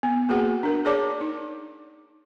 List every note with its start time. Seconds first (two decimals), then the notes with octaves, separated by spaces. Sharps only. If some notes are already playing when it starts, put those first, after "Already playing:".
0.03 B3
0.29 A#3 F#4 G#4 B4 F#5
0.63 D4 A#4
0.85 G#4 C#5 D5 A5 D6
1.21 D#4